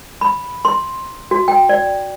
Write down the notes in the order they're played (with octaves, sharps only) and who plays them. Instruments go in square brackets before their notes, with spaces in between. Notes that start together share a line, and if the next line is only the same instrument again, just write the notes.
[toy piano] B5
C6
F#4
G5
D5